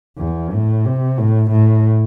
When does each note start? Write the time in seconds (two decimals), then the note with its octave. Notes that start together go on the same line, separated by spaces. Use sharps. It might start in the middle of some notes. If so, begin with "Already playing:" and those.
0.17 E2
0.52 A2
0.85 C3
1.18 A2
1.51 A2